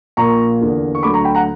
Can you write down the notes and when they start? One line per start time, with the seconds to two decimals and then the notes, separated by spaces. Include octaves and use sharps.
0.17 A#1 A#2 A#3 A#5 C#6
0.60 E2 D3 A#3
0.95 C#6
1.03 D2 D3 F#3 B5 D6
1.14 A#5 C#6
1.24 G5 B5
1.35 F#5 A#5